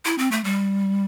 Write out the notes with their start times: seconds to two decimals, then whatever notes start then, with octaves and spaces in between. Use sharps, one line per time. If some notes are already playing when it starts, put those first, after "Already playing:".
0.05 E4
0.18 C4
0.31 A3
0.44 G3